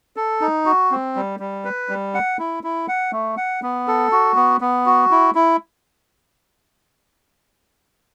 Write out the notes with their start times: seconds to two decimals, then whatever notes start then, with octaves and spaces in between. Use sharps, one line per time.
0.16 A4
0.41 D#4
0.65 F#4
0.91 C4
1.16 G3
1.40 G3
1.65 B4
1.89 G3
2.14 F#5
2.39 E4
2.64 E4
2.88 F#5
3.12 A3
3.37 F#5
3.63 B3
3.88 A4
4.12 F#4
4.36 B3
4.61 B3
4.86 F#4
5.11 E4
5.35 E4